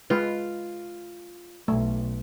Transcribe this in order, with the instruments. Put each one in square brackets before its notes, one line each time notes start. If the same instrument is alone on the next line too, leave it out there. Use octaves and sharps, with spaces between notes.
[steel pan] G#3 B4 [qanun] F4
[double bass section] B1 [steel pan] A3